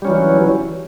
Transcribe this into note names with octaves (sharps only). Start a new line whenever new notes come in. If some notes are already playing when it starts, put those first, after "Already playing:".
E3 F#3 G3 C#4